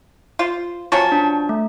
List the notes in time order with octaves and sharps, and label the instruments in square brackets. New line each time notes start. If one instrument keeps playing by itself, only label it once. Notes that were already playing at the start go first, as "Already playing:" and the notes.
[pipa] F4 C5
[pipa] F3 F#3 C#4 [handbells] A5 C#6 A6
[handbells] D4
A3